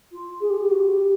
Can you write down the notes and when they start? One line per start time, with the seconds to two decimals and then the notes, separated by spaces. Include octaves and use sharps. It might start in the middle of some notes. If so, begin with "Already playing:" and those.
0.12 F4
0.40 G#4
0.49 G4
0.60 G4
0.70 F#4
0.88 G4